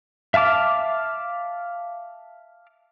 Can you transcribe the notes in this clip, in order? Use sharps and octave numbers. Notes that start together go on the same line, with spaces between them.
E5 F5 A5 D6 F6